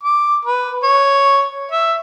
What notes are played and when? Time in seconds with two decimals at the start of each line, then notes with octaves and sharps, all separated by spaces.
0.04 D6
0.45 B4
0.83 C#5
1.72 E5